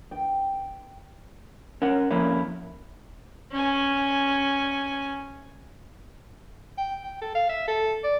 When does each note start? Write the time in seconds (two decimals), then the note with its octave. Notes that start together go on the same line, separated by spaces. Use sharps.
0.11 G5
1.82 C#4 A#4 F#5
2.11 F2 A#3 C#4 E4
3.52 C#4 G#5
6.78 G5
7.03 G5
7.22 A4
7.35 F5
7.49 E5
7.68 A4
8.04 D5